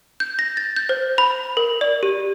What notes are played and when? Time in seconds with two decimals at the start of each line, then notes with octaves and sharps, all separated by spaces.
0.20 G6
0.39 A#6
0.57 A6
0.76 G6
0.89 C5
1.18 B5
1.57 A#4
1.81 D5
2.03 G4